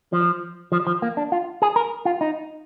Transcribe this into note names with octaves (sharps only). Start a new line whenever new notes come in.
F3
F3
F3
A#3
D4
F4
G#4
A#4
F4
D#4